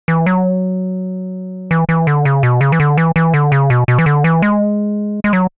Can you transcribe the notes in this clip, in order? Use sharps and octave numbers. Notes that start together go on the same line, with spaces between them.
E3
F#3
E3
E3
D3
C#3
B2
C#3
E3
D3
E3
E3
D3
C#3
B2
B2
E3
D3
E3
G#3
G#3
F#3